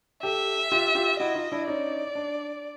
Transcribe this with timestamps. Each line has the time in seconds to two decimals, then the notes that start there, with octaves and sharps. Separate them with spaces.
0.23 G4 A4 E5
0.72 F4 G4
0.95 F4 G4
1.20 E4 F#4 D#5
1.35 D#4 F4
1.52 D4 E4
1.67 C#4 D#4 D5
2.15 D4